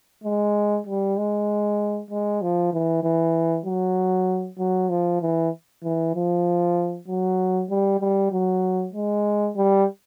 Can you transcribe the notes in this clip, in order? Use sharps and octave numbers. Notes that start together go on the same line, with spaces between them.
G#3
G3
G#3
G#3
F3
E3
E3
F#3
F#3
F3
E3
E3
F3
F#3
G3
G3
F#3
G#3
G3